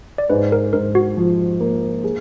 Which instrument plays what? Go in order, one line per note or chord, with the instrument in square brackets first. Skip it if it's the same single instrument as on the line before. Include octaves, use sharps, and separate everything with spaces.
[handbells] D5
[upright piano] G#2 [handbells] B4
[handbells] A#4
[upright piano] G#2 [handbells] A#4
[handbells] F#4
[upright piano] F3
A#3
G#4